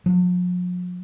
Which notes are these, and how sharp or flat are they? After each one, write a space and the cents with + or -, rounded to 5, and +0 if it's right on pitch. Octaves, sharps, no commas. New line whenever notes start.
F3 +45